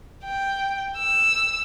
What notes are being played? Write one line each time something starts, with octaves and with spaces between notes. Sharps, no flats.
G5
E6